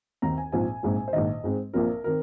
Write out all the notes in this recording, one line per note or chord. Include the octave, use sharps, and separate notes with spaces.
D#2 D#3 C4 A#5
G#5
A#1 G#2 F3 C4 G#5
A#1 G#2 G#3 C4
C5
A#1 G#2 D#3 D#5
G#2 G#3 C4
A#1 A#2 F3 C4 A#4
D#3 C4 A#4